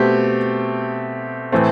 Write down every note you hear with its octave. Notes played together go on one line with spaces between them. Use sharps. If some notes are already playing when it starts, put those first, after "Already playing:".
Already playing: B2 A3 C4 G4
A2 E3 A3 C4